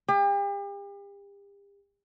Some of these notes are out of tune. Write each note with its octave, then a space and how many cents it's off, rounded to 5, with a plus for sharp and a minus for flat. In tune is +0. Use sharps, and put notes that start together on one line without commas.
G4 +40